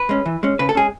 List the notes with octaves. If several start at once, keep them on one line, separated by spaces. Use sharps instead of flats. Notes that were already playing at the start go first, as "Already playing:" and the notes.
Already playing: B4
G#3 C#4
E3
G#3 C#4
C#3 B4
A4
G#3 C#4 G#4